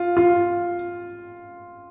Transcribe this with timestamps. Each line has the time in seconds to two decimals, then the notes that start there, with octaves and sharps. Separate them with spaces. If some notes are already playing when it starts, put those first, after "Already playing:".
Already playing: F4
0.17 F4